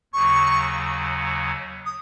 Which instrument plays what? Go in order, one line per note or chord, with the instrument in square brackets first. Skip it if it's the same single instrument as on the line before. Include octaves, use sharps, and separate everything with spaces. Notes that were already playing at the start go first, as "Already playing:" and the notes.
[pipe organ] D#2 C#3 F#3 [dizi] C#6
[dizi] D#6